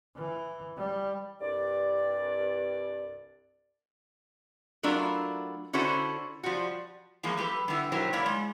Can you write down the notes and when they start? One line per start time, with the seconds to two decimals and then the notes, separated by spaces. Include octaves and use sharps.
0.16 E3
0.77 G3
1.41 C2 G2 D5
4.83 F#3 A3 D4 E4 F4 A#4
5.73 D3 C#4 E4 F#4 A4 C5
6.43 F3 G3 F4 F#4
7.23 E3 F3 G#3 A#3
7.37 G3 G4 A4 B4
7.68 D3 G3 B3 E4
7.92 B2 F#3 E4 G4 A#4 C5
8.13 A#3 E4 A#4 C#5 D5
8.26 G#3